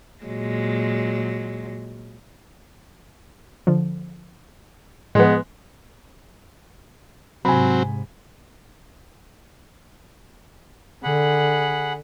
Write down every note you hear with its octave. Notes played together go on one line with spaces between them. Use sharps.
A#2 F#3 G#3
D3 F3
A2 F3 G#3 B3
G#2 C3 F#3 C4 G#5 B5
D3 G#4 F#5 B5